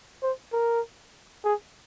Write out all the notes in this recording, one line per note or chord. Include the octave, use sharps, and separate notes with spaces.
C5
A#4
G#4